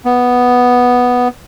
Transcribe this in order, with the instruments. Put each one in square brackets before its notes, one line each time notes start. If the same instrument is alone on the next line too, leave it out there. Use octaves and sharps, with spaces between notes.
[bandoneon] B3